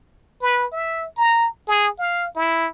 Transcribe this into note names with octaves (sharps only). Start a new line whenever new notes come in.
B4
E5
A#5
G#4
F5
E4